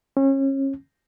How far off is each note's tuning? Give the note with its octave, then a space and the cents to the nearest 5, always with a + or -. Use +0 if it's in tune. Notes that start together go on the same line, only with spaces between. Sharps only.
C#4 -30